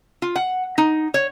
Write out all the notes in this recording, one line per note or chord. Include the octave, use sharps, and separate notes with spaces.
F4
F#5
D#4
C#5